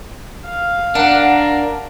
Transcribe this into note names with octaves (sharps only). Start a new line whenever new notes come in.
F5
D4 A#4 F#5